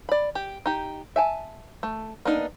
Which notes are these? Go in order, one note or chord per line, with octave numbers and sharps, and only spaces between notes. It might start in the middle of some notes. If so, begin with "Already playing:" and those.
D5 B5
G4
D#4 G4
E5 G#5 A5
A3
A#3 B3 D4 D#4